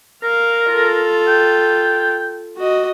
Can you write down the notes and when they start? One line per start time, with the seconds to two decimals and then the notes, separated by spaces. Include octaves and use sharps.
0.23 A#4 F5
0.70 F4 A4
1.28 G5
2.56 F#4 D#5